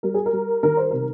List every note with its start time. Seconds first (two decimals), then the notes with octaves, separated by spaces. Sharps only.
0.03 G3 A#4
0.14 G#4
0.26 A#4
0.33 G3
0.63 D#3 A#4
0.77 C5
0.91 C3 A#4